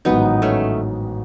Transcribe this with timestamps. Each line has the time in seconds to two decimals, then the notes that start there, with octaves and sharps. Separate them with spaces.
0.05 A1 G#2 D#3 F#3 B3 D#4
0.42 A3 C#4